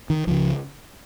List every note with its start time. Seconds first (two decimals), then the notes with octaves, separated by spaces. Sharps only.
0.10 D#3
0.27 C#2 C#3 F3